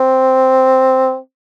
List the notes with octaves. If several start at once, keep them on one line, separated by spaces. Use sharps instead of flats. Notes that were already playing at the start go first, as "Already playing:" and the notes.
Already playing: C4